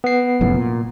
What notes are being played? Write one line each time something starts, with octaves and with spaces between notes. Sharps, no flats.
B3 C7
F1 F#2 A2
A#2